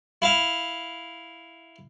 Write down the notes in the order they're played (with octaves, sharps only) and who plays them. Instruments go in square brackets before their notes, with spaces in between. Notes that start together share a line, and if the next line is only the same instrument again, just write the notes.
[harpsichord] E4 F5